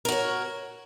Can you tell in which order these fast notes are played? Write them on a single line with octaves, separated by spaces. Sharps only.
A#4 F#4 C#5